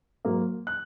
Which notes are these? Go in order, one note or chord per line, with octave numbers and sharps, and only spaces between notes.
G#2 F#3 A#3
F#6